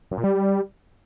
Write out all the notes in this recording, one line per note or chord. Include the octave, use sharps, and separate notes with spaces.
F#2
A#2
G3